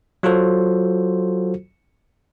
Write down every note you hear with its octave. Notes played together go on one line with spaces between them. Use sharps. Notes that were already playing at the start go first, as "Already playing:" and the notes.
F#3 F4 F#4 A4 C5